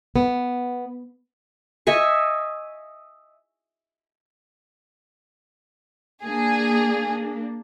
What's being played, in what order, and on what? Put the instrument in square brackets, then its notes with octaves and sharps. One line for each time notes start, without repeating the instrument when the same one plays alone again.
[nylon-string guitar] B3
[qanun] D#5 E5 G#5 C#6
[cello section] A#3 D4 [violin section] G#4